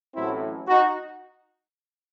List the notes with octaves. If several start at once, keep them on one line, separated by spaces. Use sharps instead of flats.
A1 A2 F#3 C4 E4
D#4 F#4